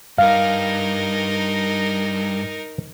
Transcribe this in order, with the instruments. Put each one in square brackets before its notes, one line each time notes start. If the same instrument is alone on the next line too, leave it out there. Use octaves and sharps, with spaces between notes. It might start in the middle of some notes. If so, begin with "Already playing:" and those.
[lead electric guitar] G2 [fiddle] D#4 A#4 [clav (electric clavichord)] F5